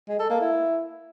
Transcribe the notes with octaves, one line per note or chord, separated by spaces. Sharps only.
G#3
A4
A#3
E4